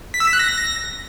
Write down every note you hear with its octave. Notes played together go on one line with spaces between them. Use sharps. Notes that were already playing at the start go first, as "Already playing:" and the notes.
B6
E6
B6
F#6
A#6